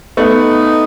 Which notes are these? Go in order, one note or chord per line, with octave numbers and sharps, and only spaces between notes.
A3 B3 D#4